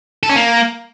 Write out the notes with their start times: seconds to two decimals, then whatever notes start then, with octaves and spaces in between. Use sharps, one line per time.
0.23 A4
0.30 C#4
0.36 A#3